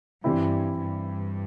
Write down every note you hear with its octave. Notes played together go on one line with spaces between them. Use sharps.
G2 E3 G3 C4 E4
G2